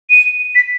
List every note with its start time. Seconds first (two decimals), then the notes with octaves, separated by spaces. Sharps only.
0.10 D#7
0.55 B6